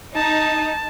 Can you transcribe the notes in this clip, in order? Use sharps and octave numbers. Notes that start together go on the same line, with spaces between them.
D#4 A5